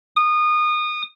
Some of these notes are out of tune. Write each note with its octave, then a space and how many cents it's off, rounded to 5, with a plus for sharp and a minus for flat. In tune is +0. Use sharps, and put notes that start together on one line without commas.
D#6 -25